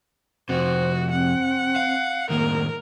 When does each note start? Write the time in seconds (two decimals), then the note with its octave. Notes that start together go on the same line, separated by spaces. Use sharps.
0.49 F2 C3 F#4 C5
1.11 C4 F#5
1.76 F5
2.30 A2 D#3 A#3 A#4